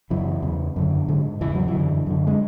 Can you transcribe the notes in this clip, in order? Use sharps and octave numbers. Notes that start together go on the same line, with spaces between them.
F#2 C#3 E3
E2 C#3
F#2 D3
G#2 D3
E2 C#3 E3
F#3
E3
F#2 D3
F#2 D3
G#3